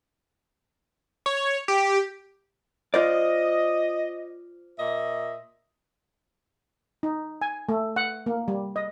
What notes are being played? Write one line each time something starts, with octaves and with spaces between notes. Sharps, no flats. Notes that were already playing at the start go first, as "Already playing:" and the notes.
C#5
G4
F4 C5 D5 D#5
A#2 D#5 E5
D#4
G#5
A3
F#5
A#3
G3
D#5